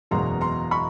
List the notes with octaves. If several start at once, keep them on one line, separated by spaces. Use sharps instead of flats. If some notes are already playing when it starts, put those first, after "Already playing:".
F#1 E2 B2 G#3 A#5 C6
A#5 C6
B5 C#6